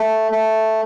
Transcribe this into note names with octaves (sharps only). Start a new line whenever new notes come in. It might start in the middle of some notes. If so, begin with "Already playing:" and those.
Already playing: A3
A3